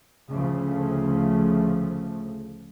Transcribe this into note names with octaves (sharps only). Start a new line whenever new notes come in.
D2 C#3 F3 A3